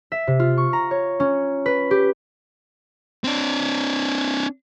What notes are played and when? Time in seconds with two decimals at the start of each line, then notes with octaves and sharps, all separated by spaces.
0.12 E5
0.27 C3
0.39 F4
0.57 C#6
0.73 A#5
0.91 C#5
1.20 C#4
1.66 B4
1.91 G4
3.24 C4 D4